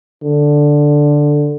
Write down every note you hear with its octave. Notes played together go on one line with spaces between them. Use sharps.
D3